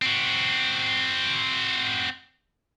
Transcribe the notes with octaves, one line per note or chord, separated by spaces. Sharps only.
C4 F#4